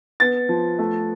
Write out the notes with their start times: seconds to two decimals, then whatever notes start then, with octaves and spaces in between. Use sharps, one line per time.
0.20 B3 A6
0.49 F3
0.79 A3